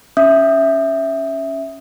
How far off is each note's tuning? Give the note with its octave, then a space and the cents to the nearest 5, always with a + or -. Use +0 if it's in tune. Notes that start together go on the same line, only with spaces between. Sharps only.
C#4 +0 E5 +0 D#6 +0